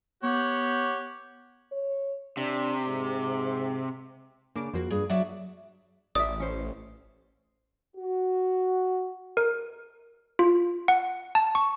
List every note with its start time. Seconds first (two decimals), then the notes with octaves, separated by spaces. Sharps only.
0.23 B3 G4 C#5 F#5
1.72 C#5
2.37 C3 D4
2.88 G#2
4.56 C#3 A#3 D4 D6
4.74 F2 F3 A#3 F#4 C5
4.91 G2 G#4
5.10 F#3 F#4 D5 E5
6.15 A1 D5 E5 D#6
6.40 C#4 C5
7.97 F#4
9.37 A#4
10.39 F4
10.88 F#5
11.35 A5
11.55 C#6